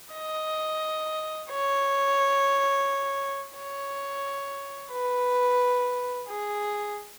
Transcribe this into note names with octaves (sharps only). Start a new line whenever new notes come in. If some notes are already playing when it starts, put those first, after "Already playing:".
D#5
C#5
C#5
B4
G#4